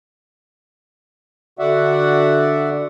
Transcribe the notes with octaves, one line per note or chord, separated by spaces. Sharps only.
D3 F#4 D5 E5 F#5